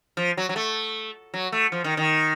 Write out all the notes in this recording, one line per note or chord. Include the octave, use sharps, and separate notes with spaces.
F3
F#3
F#3
A3
F#3
A3
F3
D#3
D#3